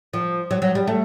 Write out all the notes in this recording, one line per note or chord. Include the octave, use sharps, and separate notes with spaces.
F3
F#3
F#3
G3
A3